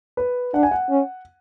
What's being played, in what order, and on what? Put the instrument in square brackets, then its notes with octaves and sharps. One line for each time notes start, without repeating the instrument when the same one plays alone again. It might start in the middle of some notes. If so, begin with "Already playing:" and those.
[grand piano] B4
[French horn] D4 [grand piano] F#5
[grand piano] G#5
F#5
[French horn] C#4